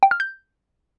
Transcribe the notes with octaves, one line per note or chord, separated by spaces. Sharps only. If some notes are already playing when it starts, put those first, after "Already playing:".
G5
F6
G6